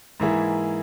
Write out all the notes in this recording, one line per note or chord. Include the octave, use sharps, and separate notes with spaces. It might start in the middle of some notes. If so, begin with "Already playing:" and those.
G#2 E3 A#3 E4 G#4